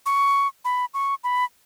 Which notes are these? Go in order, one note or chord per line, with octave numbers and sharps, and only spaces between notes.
C#6
B5
C#6
B5